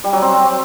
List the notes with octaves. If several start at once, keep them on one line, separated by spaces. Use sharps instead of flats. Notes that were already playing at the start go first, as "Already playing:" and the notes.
G3
F#3
C4